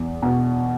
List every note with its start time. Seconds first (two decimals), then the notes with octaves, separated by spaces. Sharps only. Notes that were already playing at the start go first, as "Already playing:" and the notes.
Already playing: E2
0.22 B2